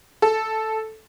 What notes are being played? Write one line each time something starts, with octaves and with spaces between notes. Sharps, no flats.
A4